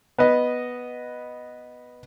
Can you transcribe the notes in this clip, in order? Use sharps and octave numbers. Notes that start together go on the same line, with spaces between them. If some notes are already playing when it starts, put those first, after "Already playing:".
B3 B4 D#5